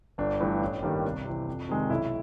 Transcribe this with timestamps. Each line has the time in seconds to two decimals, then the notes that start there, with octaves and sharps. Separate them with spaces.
0.18 G1 D4
0.40 G2 E3 A3
0.62 A1
0.82 G2 D#3 G3 A#3
1.04 C2
1.25 C3 E3
1.48 F2
1.69 C3 D#3 G#3
1.90 B1 E4